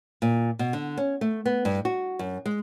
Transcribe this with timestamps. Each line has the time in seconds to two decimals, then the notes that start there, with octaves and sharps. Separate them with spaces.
0.22 A#2
0.59 B2
0.73 D3
0.97 C#4
1.21 A3
1.46 B3
1.65 G2
1.85 F#4
2.19 F#2
2.46 G#3